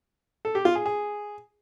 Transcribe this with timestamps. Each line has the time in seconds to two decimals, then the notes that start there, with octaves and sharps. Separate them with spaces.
0.45 A4
0.55 G4
0.65 F4
0.75 G#4
0.86 G#4